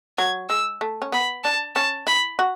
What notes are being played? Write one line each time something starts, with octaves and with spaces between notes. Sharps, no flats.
F#3 G#6
G#3 E6
A3
C#4
B3 B5
D4 A5
C#4 A5
E4 B5
F#4